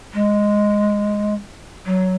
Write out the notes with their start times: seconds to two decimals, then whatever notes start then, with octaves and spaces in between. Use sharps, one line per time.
0.14 G#3
1.86 F#3